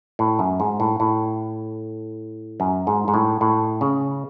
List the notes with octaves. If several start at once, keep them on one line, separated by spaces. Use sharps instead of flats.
A2
F#2
G#2
A2
A2
F#2
G#2
G#2
A2
A2
C#3